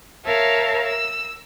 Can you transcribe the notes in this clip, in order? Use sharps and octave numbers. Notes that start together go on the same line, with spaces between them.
A#4 C#5 E5 F5 A5
E6